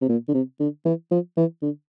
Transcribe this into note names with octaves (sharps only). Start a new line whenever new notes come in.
C3
A#2
D3
C3
D3
E3
F3
E3
D3